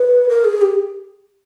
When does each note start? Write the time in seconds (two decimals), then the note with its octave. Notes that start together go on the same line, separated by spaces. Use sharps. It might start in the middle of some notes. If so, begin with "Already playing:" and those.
Already playing: B4
0.29 A#4
0.45 G#4
0.61 G4